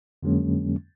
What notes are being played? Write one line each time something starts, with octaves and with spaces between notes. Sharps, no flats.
F2 D3 F#3 G#3 A#3 C#4